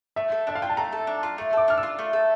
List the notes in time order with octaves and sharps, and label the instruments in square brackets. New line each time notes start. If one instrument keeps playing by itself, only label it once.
[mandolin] A3 [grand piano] E5
[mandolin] A4
[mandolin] D4 [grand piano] E5
[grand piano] F5
[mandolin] F4 [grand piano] G5
[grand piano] A5
[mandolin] A3 [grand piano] A#5
[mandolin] A4
D4
F4
A3
[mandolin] A4 [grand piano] D6
[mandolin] D4 [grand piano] F6
[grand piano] E6
[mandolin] F4
A3
A4